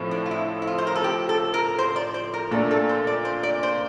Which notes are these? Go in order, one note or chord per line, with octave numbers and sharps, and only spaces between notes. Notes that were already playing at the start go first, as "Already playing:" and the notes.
Already playing: A2 F3 C4
D4
F4
E4
E4
F4
C5
A#4
A4
G4
A4
A#4
C5
D5
C5
A#4
A#2 A3 D4 A4
A4
C5
D5
C5
D5
C5